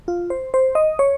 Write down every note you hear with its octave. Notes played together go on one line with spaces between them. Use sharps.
F4
C5
C5
D#5
C#5